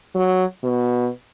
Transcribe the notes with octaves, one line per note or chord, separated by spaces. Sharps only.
F#3
B2